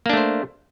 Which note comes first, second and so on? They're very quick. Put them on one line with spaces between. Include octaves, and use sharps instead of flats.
A#3 D4 A3 C5